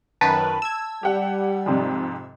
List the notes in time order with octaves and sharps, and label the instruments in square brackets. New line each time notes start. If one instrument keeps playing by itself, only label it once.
[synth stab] F#2 D#3 B4 [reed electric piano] A5
[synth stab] E6 G#6
[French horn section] G3 [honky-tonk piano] G4 F#5
[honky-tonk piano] F2 G#2 C3